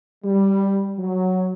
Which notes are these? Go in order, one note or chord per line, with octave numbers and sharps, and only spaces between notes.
G3
F#3